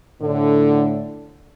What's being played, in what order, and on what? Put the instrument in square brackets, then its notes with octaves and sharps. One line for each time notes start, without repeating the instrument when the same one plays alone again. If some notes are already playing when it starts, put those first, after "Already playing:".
[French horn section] A2 D3